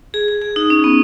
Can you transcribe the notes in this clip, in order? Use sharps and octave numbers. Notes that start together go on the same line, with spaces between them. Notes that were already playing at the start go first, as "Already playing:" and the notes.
G#4
G#4
G#4
D#4
C#4
B3